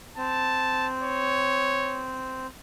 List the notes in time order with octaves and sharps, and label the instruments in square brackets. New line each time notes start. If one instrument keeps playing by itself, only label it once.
[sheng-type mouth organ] C4 [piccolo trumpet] A5
[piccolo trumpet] C#5